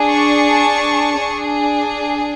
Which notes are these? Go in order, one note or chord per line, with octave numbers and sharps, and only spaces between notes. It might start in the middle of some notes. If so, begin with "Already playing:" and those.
Already playing: D4 G#4
A5 C#6
D4 G#4